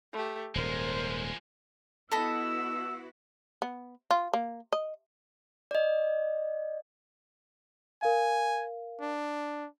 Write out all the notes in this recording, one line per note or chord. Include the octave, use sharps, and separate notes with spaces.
A3 G4
D#1 G#2 F3 G#3 A#4 C5
B3 E4 F#4 A4 D#5 B5 E6
B3
F4
A#3
D#5
D5 D#5
A#4 F5 G#5
D4